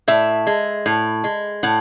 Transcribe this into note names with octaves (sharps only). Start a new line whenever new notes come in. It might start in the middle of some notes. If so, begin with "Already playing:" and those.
A2 E5
G#3
A2
G#3
A2 F#5